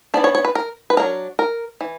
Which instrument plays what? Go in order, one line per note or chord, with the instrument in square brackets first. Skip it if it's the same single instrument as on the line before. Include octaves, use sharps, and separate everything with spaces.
[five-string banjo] E3 B3 D4 D5
C#5
C#5
B4
A#4
B4
F#3 A#3 D4 A#4
A#4
E3